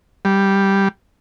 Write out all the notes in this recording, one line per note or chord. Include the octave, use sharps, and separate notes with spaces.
G3